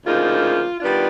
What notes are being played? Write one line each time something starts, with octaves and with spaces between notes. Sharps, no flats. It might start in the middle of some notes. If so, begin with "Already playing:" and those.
D2 C#3 F3 A#3 D#4 F4
D#3 G3 B3 D4 F4